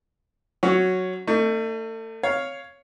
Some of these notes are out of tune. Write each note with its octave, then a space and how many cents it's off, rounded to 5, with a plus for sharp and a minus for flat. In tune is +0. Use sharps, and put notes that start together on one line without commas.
F#3 +0 C#4 +0
A3 +35 D#4 -20
C#5 +5 F5 +0